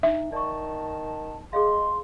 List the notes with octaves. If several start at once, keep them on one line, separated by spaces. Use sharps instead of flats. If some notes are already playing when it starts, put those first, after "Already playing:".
D4 D#4 E5
D#3 D5 A5 C#6
G#3 G#4 C#5 F5 C6